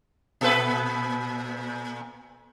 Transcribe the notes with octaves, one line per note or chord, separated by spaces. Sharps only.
A#2 A4 B4